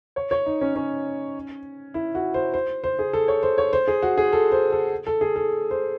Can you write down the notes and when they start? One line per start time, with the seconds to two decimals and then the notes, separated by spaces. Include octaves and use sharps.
0.16 C#5
0.31 C#5
0.46 D#4
0.61 C#4
0.76 C#4
1.94 E4
2.15 F#4
2.34 C5
2.54 C5
2.84 C5
2.99 G#4
3.13 A4
3.28 C#5
3.43 C5
3.58 C#5
3.73 C5
3.88 G#4
4.02 F#4
4.17 G#4
4.32 A4
4.52 C5
4.72 A4
5.07 A4
5.21 G#4
5.36 A4
5.71 C5